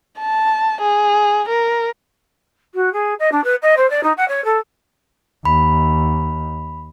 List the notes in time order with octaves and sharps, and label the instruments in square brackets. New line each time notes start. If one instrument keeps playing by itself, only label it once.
[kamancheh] A5
G#4
A#4
[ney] F#4
G#4
D#5
D4
B4
D#5
C5
D5
D#4
F#5
C#5
A4
[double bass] D#2 [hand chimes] B5